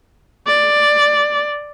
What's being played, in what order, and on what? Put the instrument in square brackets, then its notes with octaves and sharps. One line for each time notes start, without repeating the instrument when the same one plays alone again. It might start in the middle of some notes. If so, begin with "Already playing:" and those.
[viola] D5